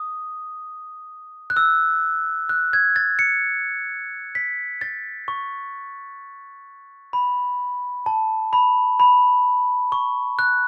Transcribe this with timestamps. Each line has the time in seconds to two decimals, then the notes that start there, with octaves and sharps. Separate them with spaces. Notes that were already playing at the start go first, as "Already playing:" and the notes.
Already playing: D#6
1.50 F#6
1.57 E6
2.49 F#6
2.73 G#6
2.96 A6
3.19 C#7
4.35 B6
4.81 A6
5.28 C#6
7.13 B5
8.06 A5
8.53 B5
9.00 B5
9.92 C#6
10.39 F#6